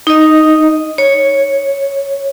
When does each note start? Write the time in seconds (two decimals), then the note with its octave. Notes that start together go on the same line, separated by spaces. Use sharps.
0.07 D#4 D#5
0.98 C#5